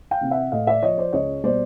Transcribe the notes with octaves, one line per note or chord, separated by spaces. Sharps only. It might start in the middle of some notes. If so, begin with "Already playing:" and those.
F5 G5
C3 E3
E5 F#5
A2 D#5 F5
D5 E5
F3 C#5 D#5
C5 D5
C#2 C#5 D#5
B2 G3 C5 D5